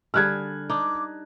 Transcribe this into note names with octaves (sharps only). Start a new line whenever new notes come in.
D3 G3 G#4 F6 F#6 G#6
D4 D#4 D6